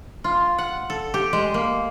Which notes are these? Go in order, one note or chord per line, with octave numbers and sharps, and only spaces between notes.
F4
F#5
A4
G4
G#3
A#3